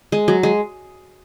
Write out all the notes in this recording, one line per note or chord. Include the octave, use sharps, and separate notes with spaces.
G#3
F#3
G#3